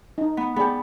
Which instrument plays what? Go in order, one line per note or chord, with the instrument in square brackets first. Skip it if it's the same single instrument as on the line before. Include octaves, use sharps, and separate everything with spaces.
[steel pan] D#4
[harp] B3
[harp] B3 [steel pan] G#4 D5 G5